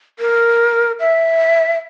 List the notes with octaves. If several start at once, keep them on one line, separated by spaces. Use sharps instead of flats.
A#4
E5